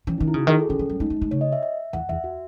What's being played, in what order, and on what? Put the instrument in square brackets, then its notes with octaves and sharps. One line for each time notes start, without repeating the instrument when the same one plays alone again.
[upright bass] E3 [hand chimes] C#4
[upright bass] D#3 [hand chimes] D#4
[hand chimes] E4
[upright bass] C#3 [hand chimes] F#4
[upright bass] D#3 [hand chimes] G#4
[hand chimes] A4
[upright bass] D#3 [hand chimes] C#4
[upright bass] E3
F#3
[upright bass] G#3 [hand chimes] D#4
[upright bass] A3
G#3
[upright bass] C#3 [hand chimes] C#5
[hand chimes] D#5
E5
E5
[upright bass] E2 [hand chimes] F#5
[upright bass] E2 [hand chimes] E5
[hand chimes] F#4